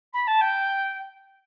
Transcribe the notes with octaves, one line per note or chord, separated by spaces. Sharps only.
B5
A5
G5